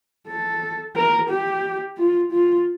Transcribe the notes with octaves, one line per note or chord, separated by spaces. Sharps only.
A4
A#4
G4
F4
F4